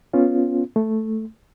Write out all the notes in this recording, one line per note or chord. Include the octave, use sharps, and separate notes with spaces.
B3 C#4 F4
A3